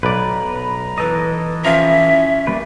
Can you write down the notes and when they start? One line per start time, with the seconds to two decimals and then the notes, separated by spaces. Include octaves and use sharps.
0.03 B1 B4 D5 A#5
0.98 E3 A4 B4 D#5
1.65 F3 C#4 E5 A#5
2.47 G3 A#3 B4